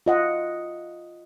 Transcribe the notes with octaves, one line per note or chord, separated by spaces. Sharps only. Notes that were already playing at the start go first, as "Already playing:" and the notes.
F4 D#5 F#5